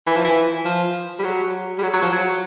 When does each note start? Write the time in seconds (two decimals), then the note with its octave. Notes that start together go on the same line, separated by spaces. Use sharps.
0.07 E3
0.16 F3
0.24 E3
0.65 F3
1.19 G3
1.24 F#3
1.78 G3
1.83 F#3
1.94 F#3
2.02 F3
2.13 F#3